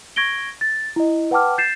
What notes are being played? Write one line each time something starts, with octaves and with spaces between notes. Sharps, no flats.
C#6 G#6 A#6 D7 G7
A6
E4 D#5
B4 F#5 G5 A5 D6 F6
G6 A6 C7 E7